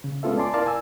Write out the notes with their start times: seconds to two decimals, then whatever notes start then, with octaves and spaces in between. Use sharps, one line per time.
0.04 C#3
0.23 G#3 B3 C#4 F4 A4 E5
0.37 D5 G#5 A5 C6 D6
0.54 E4 A#4 D5 F5 A5 A#5
0.66 G#5 E6